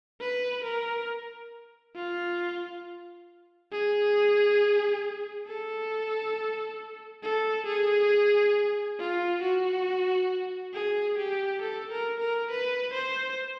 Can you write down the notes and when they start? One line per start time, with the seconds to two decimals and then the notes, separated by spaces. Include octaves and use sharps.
0.20 B4
0.64 A#4
1.95 F4
3.72 G#4
5.47 A4
7.23 A4
7.66 G#4
8.99 F4
9.42 F#4
10.74 G#4
11.18 G4
11.62 A4
11.92 A#4
12.21 A#4
12.51 B4
12.94 C5